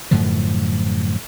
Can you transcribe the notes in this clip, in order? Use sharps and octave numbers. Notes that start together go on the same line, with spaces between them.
F#2 A2 D3 F3